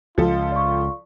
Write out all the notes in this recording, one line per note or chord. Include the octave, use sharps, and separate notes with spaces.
C#2 F3 F4 A4
D5 C#6